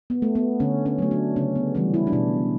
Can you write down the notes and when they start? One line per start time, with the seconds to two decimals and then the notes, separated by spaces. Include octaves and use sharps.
0.10 B3
0.22 A3
0.35 B3
0.60 D3 C#4
0.86 C#4
0.98 F#3 A3
1.11 D4
1.36 C#3 C#4
1.56 B3
1.75 E3 G3 C#4
1.94 E4
2.07 D4
2.13 B2 E4